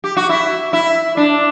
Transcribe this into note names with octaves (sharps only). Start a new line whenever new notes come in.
G4
F#4
E4
E4
D4